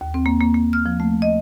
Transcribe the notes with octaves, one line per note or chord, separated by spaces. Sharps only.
D#2
C4
A#3
A#3
A#3
F6
F3
A3
D#5